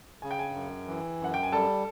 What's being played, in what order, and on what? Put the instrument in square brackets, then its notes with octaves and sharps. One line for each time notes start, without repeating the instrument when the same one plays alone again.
[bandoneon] C#3 [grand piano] G#5
[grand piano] G5
G#4 G#5
[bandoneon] F#2
E3
[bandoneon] F#2 [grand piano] F#5
[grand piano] G5
G#5
[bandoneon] G3 [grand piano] A4 A5